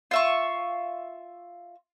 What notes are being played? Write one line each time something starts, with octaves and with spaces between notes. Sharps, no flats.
F4 E5 C#6